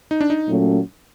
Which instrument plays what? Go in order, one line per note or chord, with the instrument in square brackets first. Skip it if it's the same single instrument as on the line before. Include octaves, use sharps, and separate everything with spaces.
[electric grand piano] D#4
D4
D#4
[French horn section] A#2 F#3 A3 C#4